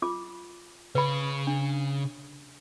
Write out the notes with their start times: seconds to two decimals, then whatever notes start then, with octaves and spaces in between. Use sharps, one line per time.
0.02 F4 D6
0.95 C#3 B4 B5
1.47 D4